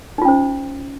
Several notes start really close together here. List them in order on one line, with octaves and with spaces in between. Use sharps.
D#4 F4 C#4 C5